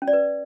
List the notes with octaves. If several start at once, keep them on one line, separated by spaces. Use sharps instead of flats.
C#4
D5
B4